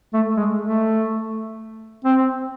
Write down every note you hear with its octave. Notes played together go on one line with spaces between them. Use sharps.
A3
G#3
A3
C4